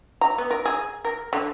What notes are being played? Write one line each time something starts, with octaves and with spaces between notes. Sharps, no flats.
A#5
B3
A#4
G#4
A#4
D3